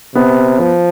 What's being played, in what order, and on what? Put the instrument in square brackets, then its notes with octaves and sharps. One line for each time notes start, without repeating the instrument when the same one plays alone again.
[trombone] C3 [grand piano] B3
[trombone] F3